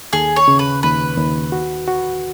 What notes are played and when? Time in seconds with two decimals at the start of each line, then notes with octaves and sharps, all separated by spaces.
0.13 D#2 G#4
0.36 C#5
0.48 C#3
0.59 B4
0.83 D#2 B4
1.18 D#2
1.52 F#4
1.88 F#4